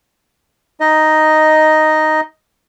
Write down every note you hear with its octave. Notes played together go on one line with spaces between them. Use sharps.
D#4 D#5